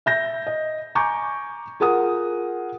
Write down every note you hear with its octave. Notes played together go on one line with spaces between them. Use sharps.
E5 G6 A#6
D#5
G#5 A#5 C#6 D6 G6
F4 G#4 A#4 F#5 D#6